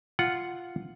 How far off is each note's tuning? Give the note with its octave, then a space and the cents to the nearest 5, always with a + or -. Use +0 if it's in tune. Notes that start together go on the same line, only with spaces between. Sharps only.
F4 +0 F#5 +0